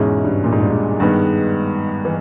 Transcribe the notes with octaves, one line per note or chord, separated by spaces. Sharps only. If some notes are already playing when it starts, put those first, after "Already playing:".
Already playing: E2 G#2 B2 G#3 C#4 E4
G2
A#2
G#2
G2
G#2
G2 D#3 G#3 B3
E3